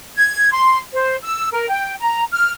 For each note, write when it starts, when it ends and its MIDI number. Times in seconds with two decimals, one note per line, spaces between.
0.16 0.52 92
0.52 0.79 84
0.94 1.16 72
1.22 1.48 88
1.52 1.68 70
1.69 1.94 79
2.00 2.24 82
2.31 2.52 89